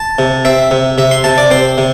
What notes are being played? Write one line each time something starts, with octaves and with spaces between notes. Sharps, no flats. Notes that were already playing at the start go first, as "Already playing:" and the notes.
Already playing: A5
C3
C4 E5
C3
C3 E5
C6
C3 A5
D5
C4 C5
C3